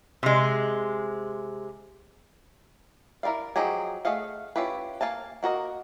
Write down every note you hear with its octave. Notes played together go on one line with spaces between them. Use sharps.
C3 G#3
E4 A#4 B4 D5 F5
F3 F#3 D#4 G4 G#4
A3 G#4 D#5 F5 F#5
C#4 E4 F4 G4 B4
A#3 F4 F5 G#5 A5
A#3 F#4 A#4 D#5